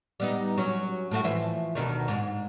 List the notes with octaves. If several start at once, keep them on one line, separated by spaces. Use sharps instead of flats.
G3 B3 D#4
F#3 C#4
A2 A3 F#4
E3 F3 E5
D2 B2 D#3
G#2